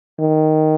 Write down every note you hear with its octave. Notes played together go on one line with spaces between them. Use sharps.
D#3